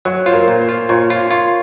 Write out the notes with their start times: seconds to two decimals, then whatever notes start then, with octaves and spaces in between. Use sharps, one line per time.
0.05 F#3 C#5
0.26 F4 C5
0.33 A#4
0.48 A#2
0.61 C5
0.69 F4
0.89 A#2 C#5
1.10 F4 C6
1.30 F4 C#6